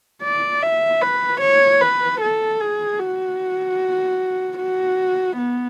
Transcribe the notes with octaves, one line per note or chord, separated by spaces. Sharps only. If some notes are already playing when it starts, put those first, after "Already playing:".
D5
E5
B4
C#5
B4
A4
G#4
F#4
F#4
B3